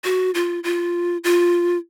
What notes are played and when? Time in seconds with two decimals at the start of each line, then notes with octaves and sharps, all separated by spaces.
0.04 F#4
0.34 F4
0.64 F4
1.24 F4